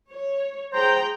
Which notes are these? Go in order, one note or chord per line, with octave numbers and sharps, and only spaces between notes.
C#5
G#4 C5 G5 A#5